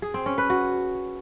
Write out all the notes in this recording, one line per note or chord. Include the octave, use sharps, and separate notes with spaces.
G#4
C4
C#4
B4
F#4